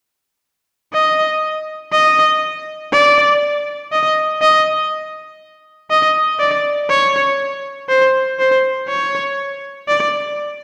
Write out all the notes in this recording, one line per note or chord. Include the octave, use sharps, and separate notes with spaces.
D#5
D#5
D5
D#5
D#5
D#5
D5
C#5
C5
C5
C#5
D5